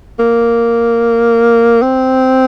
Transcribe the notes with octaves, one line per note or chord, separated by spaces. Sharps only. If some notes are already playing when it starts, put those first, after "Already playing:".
A#3
C4